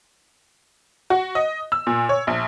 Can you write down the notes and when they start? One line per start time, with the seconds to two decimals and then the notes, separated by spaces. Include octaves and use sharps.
1.10 F#4
1.35 D#5
1.72 E6
1.87 A#2
2.09 C#5
2.27 A#1